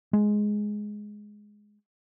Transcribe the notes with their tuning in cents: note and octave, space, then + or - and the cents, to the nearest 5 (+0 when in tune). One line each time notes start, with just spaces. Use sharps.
G#3 +5